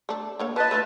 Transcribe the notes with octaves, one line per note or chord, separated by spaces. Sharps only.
A3 D4
D3 A#3 C#5
F3 B4 D#5 A5
A3 D4 F4